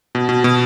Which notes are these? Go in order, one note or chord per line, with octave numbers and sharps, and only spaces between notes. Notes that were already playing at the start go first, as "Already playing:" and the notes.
B2
B2
B2